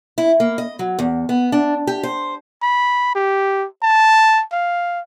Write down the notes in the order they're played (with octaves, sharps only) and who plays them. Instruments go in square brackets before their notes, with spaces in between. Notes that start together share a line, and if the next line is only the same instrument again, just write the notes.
[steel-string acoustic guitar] E4
A#3
D#5
F#3
E2
B3
D4
G4
C5
[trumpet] B5
G4
A5
F5